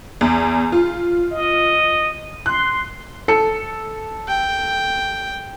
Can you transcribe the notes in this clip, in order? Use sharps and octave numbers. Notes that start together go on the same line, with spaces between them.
E2
F4
D#5
C6 F#6
A4 C#7
G5